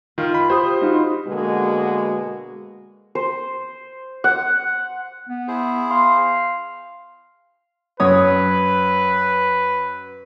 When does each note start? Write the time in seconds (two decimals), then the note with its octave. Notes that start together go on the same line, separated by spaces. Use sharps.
0.18 D#3 F4
0.34 B5
0.50 G4 C5 D#6
0.81 D#4 F4 F#4
1.27 B2 D3 G#3 A#3 B3 F#4
3.15 C5
4.24 F#5
5.28 B3
5.48 E4 G#4 C5
5.91 F5 C6
8.00 F#2 B4 C#5 D#6